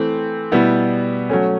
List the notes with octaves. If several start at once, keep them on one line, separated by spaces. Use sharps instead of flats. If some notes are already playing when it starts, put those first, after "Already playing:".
Already playing: E3 A3 C4
B2 G3 B3 E4
F#3 A3 C#4